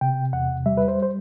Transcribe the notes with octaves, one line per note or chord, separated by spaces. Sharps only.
C3 G5
E2 F#5
G3 E5
B4
C5
C5